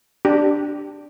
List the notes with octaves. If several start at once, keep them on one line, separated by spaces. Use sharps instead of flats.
D4 G4